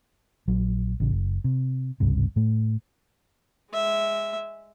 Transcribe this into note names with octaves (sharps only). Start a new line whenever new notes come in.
A#1 F#3
A1 C#3
F#1
C3
G#1 C#2 G2 C3
A2 A3
G#3 E5